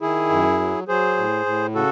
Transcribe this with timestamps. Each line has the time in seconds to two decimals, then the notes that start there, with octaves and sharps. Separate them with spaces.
0.01 D#3 E4 G#4
0.30 F#2
0.59 F#3
0.88 F#3 G#4 C5
1.17 A2
1.46 A2
1.75 C#3 F#4 A4